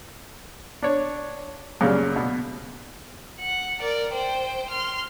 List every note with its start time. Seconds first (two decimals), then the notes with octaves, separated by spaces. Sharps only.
0.83 D4 C#5
1.81 F#2 A#2 C#3 G3
2.16 B2
3.40 F#5
3.80 A#4 D5
4.12 C5 G5
4.70 C6 F6